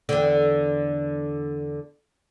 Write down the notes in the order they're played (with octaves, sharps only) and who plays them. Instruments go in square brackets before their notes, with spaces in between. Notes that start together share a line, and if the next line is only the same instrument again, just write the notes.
[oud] E2 D3